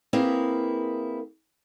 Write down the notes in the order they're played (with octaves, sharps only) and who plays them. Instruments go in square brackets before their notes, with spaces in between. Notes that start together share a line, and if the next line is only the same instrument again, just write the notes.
[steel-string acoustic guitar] A#3 C4 E4 G#4 A#4 B4